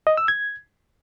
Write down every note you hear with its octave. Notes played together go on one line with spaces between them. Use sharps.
D#5
E6
G#6